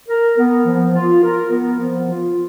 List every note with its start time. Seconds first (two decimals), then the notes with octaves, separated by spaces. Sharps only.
0.09 A#4
0.38 B3
0.66 F3
0.94 F4
1.23 A#4
1.51 B3
1.79 F3
2.08 F4